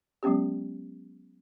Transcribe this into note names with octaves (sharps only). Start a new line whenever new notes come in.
F#3 G#3 B3 C#4 G4